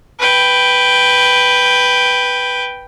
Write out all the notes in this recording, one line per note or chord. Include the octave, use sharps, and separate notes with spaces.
B4 G5